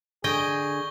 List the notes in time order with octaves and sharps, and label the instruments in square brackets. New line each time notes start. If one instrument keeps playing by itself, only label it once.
[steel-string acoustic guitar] D3 [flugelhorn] G#4 [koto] D#5 G5 [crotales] C#6 G#6 G7